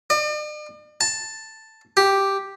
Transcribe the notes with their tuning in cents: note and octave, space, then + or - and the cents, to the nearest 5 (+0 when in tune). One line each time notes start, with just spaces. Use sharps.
D5 +45
A5 +5
G4 +0